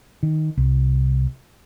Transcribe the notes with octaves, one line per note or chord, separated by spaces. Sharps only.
D#3
C2